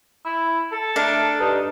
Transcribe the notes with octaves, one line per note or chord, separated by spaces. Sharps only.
E4
A4
A3 D4 A#4
G2 D#4